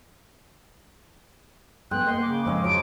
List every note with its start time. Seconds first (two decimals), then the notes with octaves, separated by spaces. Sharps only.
1.91 G2 A#3 B3 G#4 G5 C6 F#6
2.07 A#3 D#5 F#5 C6
2.22 C#3 D6
2.46 F2 G#2 C4 C#4 D#5
2.64 F3 F#3 C6 D7